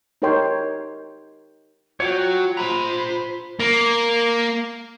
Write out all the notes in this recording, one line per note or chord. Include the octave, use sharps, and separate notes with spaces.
D#4 G4 A#4 C#5 G5 C6
F#3 F4 C#5 F#5 G5
C5 A#5 B5
A#3